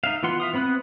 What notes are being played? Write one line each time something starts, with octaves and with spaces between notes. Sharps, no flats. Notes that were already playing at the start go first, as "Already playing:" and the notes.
D#4 E5 F5
E3 B3 F4 F#5 C6
E5 F5 D#6
B3 C4 B5 D#6 F#6